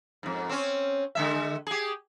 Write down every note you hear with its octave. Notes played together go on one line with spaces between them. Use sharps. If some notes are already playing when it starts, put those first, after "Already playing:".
F2 G#2
C4 C#4
D3 G#3 E5
G4 G#4